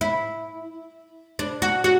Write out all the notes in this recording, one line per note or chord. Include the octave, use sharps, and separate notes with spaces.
E4
D4
F#4
F#4